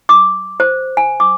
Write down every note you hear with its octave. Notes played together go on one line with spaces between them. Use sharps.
D6
C5
G#5
D6